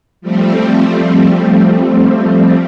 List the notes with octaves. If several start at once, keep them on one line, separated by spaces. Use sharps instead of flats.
F3 G3 A3 C4